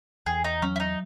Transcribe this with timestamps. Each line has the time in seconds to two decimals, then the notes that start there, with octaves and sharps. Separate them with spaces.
0.26 E2 G#4
0.44 D#4
0.62 F#3 C#4
0.76 E4
0.80 D#4